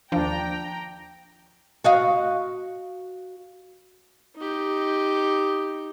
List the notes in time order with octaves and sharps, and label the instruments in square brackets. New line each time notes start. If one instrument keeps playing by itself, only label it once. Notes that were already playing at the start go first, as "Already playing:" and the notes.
[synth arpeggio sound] D#2 F3 [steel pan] D4 [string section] G5 A#5
[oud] F#4 D#5 F5
[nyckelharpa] D#4 G4